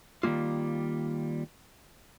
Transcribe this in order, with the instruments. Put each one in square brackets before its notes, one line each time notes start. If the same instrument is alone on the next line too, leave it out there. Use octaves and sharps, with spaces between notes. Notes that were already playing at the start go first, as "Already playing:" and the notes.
[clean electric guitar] D#3 G3 G#3 A#3 F4